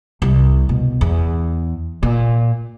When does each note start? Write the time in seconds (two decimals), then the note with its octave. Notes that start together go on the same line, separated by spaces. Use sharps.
0.22 C2
0.69 B2
1.01 E2
2.03 A#2